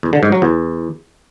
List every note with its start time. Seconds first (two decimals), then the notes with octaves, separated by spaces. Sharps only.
0.03 E2
0.13 D3
0.23 G#2
0.32 F#3
0.42 E2